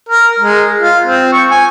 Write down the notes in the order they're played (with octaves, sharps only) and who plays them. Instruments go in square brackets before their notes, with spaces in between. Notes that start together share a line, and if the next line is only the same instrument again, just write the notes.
[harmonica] A#4
G#3
F4
C4
C#6
G#5